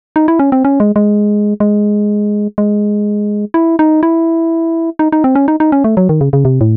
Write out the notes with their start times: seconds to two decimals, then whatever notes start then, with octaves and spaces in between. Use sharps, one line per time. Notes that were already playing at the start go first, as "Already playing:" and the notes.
0.16 D#4
0.28 E4
0.39 C#4
0.52 C4
0.65 C#4
0.80 G#3
0.96 G#3
1.60 G#3
2.58 G#3
3.54 E4
3.79 D#4
4.03 E4
4.99 D#4
5.12 D#4
5.24 C4
5.35 C#4
5.48 D#4
5.60 D#4
5.72 C#4
5.84 A3
5.97 F#3
6.09 D#3
6.21 C#3
6.33 C#3
6.45 C3
6.61 A2